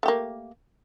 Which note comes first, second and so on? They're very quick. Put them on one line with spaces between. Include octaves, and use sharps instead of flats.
A3 G4 A#3